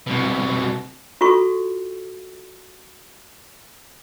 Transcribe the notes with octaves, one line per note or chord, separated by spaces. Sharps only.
C2 B2
F4 F#4 A4 C#6